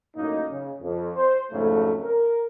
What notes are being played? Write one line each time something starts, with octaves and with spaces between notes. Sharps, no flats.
F#2 A2 A#3 D#4
C#3
F2
C5
F2 G#2 C#3 F#3 A3
A#4